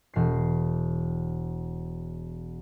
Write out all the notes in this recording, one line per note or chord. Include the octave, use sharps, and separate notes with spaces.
E1 C7